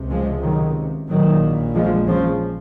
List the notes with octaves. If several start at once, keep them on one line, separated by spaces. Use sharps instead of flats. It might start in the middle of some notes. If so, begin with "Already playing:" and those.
Already playing: C#2 C3
F3 G#3
D#3 F#3
A#1 A#2 D#3 F#3
F3 G#3
C#3 F3